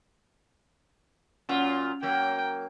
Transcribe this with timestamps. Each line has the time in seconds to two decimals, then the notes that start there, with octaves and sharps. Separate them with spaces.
1.49 A#2 F#3 C#4 F4 F#5
2.03 F#3 A#3 G5